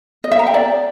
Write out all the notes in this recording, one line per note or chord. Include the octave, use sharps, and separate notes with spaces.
D#5
E5
A#5
G5
D5